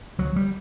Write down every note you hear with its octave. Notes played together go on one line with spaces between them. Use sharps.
D2 F#3
G3